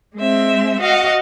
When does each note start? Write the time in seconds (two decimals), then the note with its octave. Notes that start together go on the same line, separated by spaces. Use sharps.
0.16 G#3 C4 E5
0.80 F#4 D#5 F5 F#5